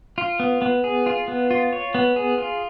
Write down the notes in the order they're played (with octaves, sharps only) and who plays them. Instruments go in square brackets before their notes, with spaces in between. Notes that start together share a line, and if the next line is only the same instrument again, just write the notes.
[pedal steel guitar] F4
B3
B3
G#4
F4
B3
F4
C#5
B3
G#4
F4